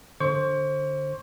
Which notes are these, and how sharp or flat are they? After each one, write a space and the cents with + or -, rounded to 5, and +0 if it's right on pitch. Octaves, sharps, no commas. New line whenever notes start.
D3 +0 C5 +25 C#6 +35